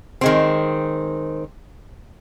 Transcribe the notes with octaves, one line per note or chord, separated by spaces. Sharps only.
D#3 G#3 C4